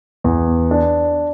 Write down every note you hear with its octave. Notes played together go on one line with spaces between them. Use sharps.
E2
D4